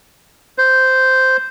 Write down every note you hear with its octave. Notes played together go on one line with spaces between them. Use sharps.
C5